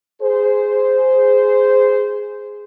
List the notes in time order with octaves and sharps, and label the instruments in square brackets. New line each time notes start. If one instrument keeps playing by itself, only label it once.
[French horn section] G#4 C5